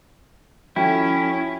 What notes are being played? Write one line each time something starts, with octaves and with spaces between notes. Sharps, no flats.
F3 C#4 E4 F#4 A4 G5 G#5